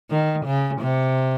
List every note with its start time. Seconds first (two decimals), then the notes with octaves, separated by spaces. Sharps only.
0.11 D#3
0.46 C#3
0.81 C3